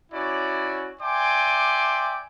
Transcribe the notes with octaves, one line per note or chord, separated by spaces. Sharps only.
C#4 E4 F#4 C#5 D5
D5 E5 G5 G#5 C6 D6